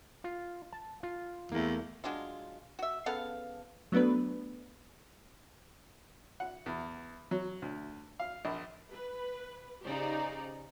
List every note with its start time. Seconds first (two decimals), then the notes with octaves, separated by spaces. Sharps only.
0.24 F4
0.72 A5
1.03 F4
1.52 E2 A3 A#3
2.04 F#3 G#3 D4 F4
2.79 F#4 E5
3.06 C#3 B3 A4 F5
3.92 F#3 A3 B3 D4 B4
6.40 F#5
6.66 E2
7.31 F#3
7.62 D2
8.19 F5
8.45 A#1
8.93 B4
9.83 C#3 D#4 G4 C5 D5